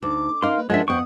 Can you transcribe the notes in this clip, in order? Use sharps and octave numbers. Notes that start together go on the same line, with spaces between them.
D2 D#4 D6
C#4 D#4 A#4 F5 C6
A#3 B4
F3 G#3 C#4 D4 A#4 E5 F#5
F2 B3 C5 F#5 G5 C#6 D#6